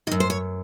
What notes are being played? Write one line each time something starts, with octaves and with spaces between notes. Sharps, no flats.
D#3 D#5
F#2
C5
C#5